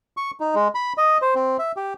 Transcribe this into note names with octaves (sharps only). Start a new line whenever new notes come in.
C#6
D#4
G#3
B5
D#5
C5
C4
E5
G4